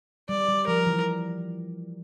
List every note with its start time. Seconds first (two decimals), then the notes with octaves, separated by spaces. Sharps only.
0.29 G3 D5
0.49 G3
0.67 F3 A#4
0.87 E3